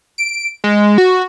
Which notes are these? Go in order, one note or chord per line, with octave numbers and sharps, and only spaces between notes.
D7
G#3
F#4